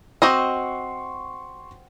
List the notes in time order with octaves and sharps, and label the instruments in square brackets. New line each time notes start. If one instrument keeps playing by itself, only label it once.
[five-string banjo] C4 F#4 D#5 [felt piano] C6 C#6